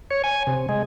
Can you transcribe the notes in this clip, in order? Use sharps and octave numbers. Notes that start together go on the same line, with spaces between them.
C#5
G#5
C3
G#3